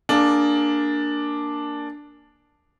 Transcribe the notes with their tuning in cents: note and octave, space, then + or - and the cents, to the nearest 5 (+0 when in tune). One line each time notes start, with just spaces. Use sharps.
A#3 +0 D4 +0 G#4 +20